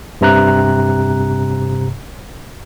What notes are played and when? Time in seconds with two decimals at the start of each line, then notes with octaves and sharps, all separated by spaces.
0.21 G2 C3 A#5 F#6